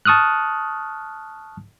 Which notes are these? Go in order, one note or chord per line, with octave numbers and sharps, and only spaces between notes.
A5 C#6 D#6 F6 F#6